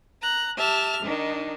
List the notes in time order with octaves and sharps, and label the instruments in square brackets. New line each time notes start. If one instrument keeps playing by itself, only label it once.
[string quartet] A#5 F#6
G4 E5 A5 F6
D#3 D4 D#4